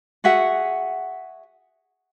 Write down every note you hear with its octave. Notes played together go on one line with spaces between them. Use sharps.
F#4 G#4 E5 F#5